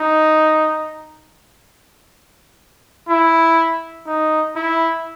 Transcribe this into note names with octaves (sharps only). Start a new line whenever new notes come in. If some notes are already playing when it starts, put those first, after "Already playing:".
Already playing: D#4
E4
D#4
E4